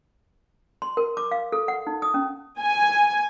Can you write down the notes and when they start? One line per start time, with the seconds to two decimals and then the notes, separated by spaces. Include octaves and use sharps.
0.82 C6
0.97 A#4
1.17 D6
1.31 F5
1.52 A4
1.68 F#5
1.87 D#4
2.02 D#6
2.14 C#4
2.60 G#5